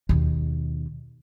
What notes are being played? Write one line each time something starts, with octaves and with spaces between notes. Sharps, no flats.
D#2 B2